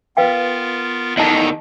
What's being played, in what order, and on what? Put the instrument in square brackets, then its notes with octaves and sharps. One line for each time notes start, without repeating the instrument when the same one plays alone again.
[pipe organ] B3 F4 A#4 [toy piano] B4 F5 G5
[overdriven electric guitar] E2 D#3 [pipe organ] A4 A#5 [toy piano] D#5 A5